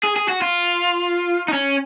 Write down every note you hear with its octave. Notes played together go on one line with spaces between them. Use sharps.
G#4
G#4
F#4
F4
D#4
C#4